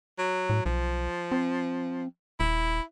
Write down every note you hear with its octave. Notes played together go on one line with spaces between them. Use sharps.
F#3
A2
B1 F3
C4
D#1 E4